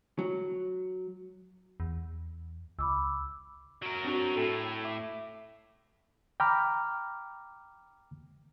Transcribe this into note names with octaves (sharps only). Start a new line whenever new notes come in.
F#3
E2
C#2 B5 D6 E6
F#3 A#4
C4 D4 F#4
A2 A4 G5 C7
E5 D6
G5 A#5 B5 D6 F6